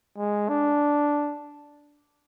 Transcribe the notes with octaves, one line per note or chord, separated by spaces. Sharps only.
G#3
D4